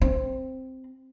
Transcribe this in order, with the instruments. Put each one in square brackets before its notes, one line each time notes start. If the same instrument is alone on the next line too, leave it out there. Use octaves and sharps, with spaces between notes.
[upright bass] C4